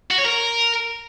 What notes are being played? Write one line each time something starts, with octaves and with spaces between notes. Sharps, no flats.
F#4
C#5
A#4